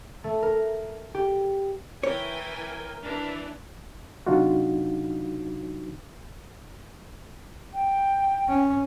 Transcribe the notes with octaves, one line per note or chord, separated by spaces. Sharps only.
A3
A#4
G4
E3 A#4 C#5 G5 G#5
E3 D4
C3 F#3 D4 D#4 F4 F#4
G5
C#4